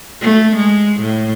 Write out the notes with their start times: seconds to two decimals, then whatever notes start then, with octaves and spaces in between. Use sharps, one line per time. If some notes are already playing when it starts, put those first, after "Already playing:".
0.22 A3
0.56 G#3
1.01 A2